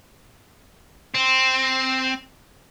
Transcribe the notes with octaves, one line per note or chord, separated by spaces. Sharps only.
C4